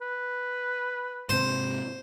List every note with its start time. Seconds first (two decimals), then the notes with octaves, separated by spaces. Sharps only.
0.02 B4
1.29 G#2 C3 C5